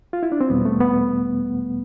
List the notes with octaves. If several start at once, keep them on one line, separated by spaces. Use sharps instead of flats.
F4
E4
D4
C4
E2 B2 G3 B3
A3
B3